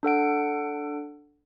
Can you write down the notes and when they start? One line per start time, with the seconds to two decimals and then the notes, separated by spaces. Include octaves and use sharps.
0.03 D4 A4 F#5 D7